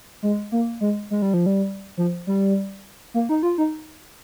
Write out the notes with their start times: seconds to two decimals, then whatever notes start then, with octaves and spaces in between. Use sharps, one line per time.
0.23 G#3
0.52 A#3
0.81 G#3
1.11 G#3
1.22 G3
1.34 F3
1.46 G3
1.97 F3
2.27 G3
3.14 A#3
3.29 D#4
3.43 F4
3.58 D#4